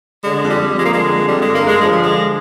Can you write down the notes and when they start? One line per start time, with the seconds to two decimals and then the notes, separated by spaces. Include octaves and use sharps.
0.23 D3 G#3
0.41 F2
0.48 G3
0.58 F2
0.75 F3 G#3
0.83 A#3
0.92 D3 G#3
1.11 F2
1.27 D3 G3
1.40 G2 G#3
1.54 A#3
1.63 G2 G#3
1.79 F3 G#3
1.91 G3
1.97 D3 G#3